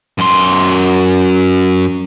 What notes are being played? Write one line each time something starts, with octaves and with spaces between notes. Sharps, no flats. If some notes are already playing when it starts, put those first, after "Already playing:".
F#2 C6